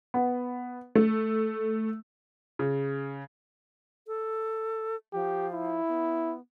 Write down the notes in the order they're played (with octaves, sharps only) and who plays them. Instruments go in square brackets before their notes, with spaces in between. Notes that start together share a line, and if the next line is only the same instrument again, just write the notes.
[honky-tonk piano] B3
A3
[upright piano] C#3
[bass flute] A4
[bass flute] F3 [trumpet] G4
[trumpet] E4
[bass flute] B3